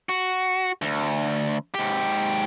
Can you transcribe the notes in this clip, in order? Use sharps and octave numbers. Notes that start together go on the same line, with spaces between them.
F#4
D2
G#2 G4